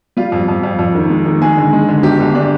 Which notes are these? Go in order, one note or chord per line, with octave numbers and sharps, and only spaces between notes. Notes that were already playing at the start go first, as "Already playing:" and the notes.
G3 F4
F2
F2
F2
F2
D#3
G#3
D#3
G#3 G#4
D3
G#3
D3
G1 G4
G1
G#3 D4